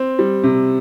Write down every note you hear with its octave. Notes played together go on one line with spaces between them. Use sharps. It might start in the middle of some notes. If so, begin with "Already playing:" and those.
Already playing: C4
G3
C3